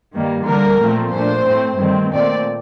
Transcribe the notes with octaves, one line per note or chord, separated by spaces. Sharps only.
G2 D#3 G3 A#3
D3 G3 A#3 D4 A#4
A#2 F3 A3 C4
A#2 A3 D4 C5
A2 A3 C4
G2 D#3 A3 C4
A#2 A3 C4 D5